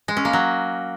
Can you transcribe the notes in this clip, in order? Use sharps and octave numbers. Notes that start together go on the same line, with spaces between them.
G#3
C#4
A#3
F#3